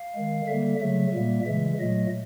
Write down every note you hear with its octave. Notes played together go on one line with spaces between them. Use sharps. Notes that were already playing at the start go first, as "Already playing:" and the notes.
Already playing: F5
D#3 G#3
D3 G3 A#3 E5
C#3 F#3 A3 E5
A#2 G3 A#3
C#3 E3 G#3 E5
A#2 F#3 A3 D#5